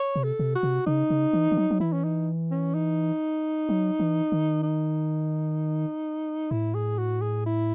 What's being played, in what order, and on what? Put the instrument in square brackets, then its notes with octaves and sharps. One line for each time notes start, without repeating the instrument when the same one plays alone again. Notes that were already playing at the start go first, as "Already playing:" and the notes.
Already playing: [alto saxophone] C#5
[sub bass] C3
[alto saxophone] A4
[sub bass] C3
[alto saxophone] F#4
[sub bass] C3
[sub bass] C#3 [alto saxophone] D#4
[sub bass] C#3
E3
E3
F#3
F#3
[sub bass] E3 [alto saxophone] E4
[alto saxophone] C#4
D#4
C#4
D#4
[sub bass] F#3
E3
D#3
[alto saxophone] D#4
[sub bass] A2 [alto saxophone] E4
[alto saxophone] G#4
F#4
G#4
E4